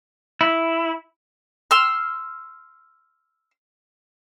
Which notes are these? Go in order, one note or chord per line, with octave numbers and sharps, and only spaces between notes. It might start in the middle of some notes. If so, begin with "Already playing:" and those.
E4
C6 E6 F6